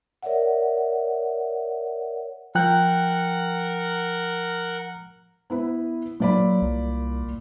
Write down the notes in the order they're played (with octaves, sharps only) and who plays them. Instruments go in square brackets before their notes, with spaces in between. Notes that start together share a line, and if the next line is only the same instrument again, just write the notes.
[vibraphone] A#4 C#5 D5 E5 F#5
[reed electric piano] F3 G5 F#6 [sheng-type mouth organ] A#4 F#5
[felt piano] B3 E4 B4
[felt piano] A#2 D5 B5 [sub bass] F#3
[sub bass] C2